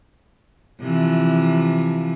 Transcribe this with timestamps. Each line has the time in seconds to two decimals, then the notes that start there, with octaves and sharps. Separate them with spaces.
0.81 C3 E3 F3